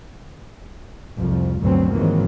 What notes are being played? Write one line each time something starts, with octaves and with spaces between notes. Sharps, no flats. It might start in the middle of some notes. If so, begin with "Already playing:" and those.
C2 F2 F3
G1 D2 B2 F#3 C4
G#2 C3 D#3 E3 F#3 A#3